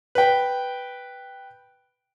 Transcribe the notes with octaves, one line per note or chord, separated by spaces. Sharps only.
B4 G5